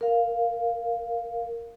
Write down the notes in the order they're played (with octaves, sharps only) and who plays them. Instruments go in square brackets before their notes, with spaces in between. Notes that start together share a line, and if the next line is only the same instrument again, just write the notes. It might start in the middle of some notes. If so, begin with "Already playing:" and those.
[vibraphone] A#4 F5